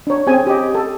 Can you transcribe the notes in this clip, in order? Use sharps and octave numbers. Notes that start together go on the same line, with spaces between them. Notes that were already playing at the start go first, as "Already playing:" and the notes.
D4 C#5
C4 C#4 G#4 G#5
G4 D#5
A4